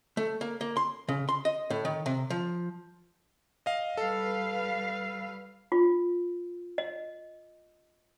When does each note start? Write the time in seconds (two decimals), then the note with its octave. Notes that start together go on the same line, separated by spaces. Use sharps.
0.17 A3
0.41 A#3
0.61 A#3
0.77 C6
1.08 C#3
1.29 C6
1.45 D#5
1.70 A2
1.85 D#3
2.06 C3
2.30 F3
3.66 D#5 F5
3.97 G3 A4 B4 F5
5.72 F4
6.78 D#5